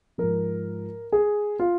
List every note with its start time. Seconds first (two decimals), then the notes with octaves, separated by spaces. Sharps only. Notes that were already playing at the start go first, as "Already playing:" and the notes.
0.18 G#2 F3 A#4
1.12 G#4
1.59 F4